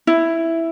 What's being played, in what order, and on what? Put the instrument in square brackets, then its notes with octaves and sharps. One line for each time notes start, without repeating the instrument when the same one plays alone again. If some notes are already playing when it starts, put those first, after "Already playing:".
[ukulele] E4